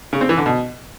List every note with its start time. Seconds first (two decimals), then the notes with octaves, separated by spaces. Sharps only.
0.13 C#3
0.21 C4
0.29 E3
0.37 D3
0.46 B2